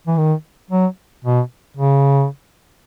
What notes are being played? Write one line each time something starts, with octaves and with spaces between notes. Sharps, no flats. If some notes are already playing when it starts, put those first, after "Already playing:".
E3
D#3
F#3
B2
C#3